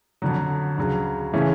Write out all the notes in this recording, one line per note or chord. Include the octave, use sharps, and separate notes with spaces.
F2 D3 F#3
D2 C#3 F#3
C#3 E3 A3 C#4